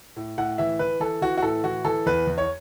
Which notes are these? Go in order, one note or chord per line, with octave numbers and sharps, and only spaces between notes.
A2
A2 F#5
E3 E5
E3 B4
E3 A4
E3 F#4
F#4
A2 A4
E3 F#4
E3 A4
E2 B4
E2
C#5